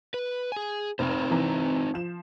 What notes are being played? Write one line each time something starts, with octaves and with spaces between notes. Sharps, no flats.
B4
G#4 G#5
F1 C4 D#4 C5
C3 E3 A#5
F3 E7